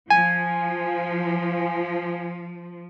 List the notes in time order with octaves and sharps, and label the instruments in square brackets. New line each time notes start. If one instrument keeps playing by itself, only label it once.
[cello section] F3 [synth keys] G#5